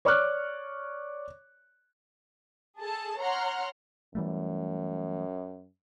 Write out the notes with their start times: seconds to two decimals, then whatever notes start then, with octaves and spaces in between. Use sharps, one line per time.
0.05 C#5 D5 C#6 D6 F6 F#6
2.79 G#4 A4 A5
3.19 C#5 F#5 A#5 C6 F6
4.15 F#2 E3 G3 A3